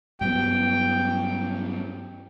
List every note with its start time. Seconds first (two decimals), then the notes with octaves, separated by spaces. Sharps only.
0.21 G2 F#3 B3 G5